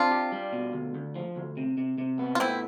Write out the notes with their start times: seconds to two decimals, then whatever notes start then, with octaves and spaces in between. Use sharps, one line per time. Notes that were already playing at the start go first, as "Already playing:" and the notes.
Already playing: C4 D4 F4
0.11 G4
0.32 G3
0.53 B2
0.73 D2
0.95 D2
1.15 F3
1.36 D2
1.57 C3
1.78 C3
1.98 C3
2.19 B3
2.35 F4
2.40 A2 C4 E4